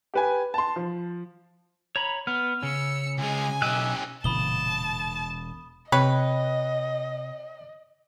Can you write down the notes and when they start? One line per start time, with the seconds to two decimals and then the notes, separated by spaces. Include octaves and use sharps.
0.14 G4 B4 G#5
0.54 A5 C6
0.76 F3
1.96 C#5 A#5 B5
2.27 B3 F6
2.62 C#3 C#4 E6 C#7
3.18 C#2 G#3 G#5
3.62 B1 C#4 G4 D#5 E6 F#6
4.24 E1 A#2 C#3 E3 A5 B5 D#6 G7
5.92 C3 B4 C#5 D#5 G5